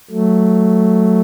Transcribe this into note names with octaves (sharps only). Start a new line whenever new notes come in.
F#3 A3